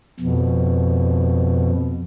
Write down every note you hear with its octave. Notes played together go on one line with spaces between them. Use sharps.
F2 B2